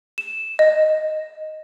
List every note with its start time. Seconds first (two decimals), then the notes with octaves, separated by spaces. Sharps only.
0.18 E7
0.59 D#5